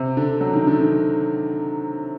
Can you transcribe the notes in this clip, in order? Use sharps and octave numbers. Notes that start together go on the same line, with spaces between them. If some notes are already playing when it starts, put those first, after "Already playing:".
Already playing: C3
D3
F#3
D#3
D3
D#3